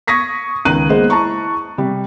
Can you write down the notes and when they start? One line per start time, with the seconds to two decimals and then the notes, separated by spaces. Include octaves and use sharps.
0.07 C#6 D#6 G#6 A#6 B6
0.65 C#2 D#3 A#5 F#6 D#7
0.89 G#3 A#3 B3 G#4 C5 D#5
1.10 E4 A5 A#5 C#6
1.78 C3 G3